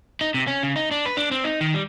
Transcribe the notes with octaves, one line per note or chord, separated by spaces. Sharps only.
D#4
C3
C#4
C#3
D#4
D4
B4
D4
C4
D#4
D#3
G3